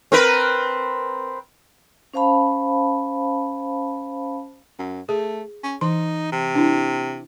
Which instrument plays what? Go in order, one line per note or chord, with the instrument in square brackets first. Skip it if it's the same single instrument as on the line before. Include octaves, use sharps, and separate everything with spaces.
[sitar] C4 A#4 B4
[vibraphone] C#4 C5 F5 A5 B5
[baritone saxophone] F#2
[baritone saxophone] A3 [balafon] G#4
[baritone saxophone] C#4
[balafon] E3 C6 [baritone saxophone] D#4
[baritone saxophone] C3
[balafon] D4 E4